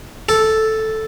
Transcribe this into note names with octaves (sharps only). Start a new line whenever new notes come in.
A4